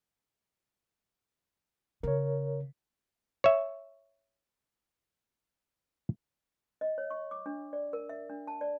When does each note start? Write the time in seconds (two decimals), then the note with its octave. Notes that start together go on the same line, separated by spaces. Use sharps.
2.03 C#3 A#4 C#5
3.44 C#5 E5
6.81 D#5
6.98 C#5
7.10 C#6
7.31 D6
7.46 D4
7.73 D5
7.93 A#4
8.09 E5
8.30 D4
8.47 A5
8.61 D5